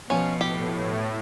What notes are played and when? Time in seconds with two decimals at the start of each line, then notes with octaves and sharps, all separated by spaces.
0.10 B2 F3 C#4
0.41 A2 G4